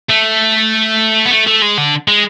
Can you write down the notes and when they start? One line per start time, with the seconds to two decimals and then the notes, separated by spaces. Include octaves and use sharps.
0.10 A3
1.25 B3
1.31 A3
1.47 A3
1.62 G#3
1.78 D3
2.08 G#3